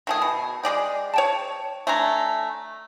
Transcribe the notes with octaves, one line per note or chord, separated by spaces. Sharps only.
D#3 A3 G#4
B2
G#3 G#4 D5 G5
C#5 G5 A5
A3 D4 G#5 A#5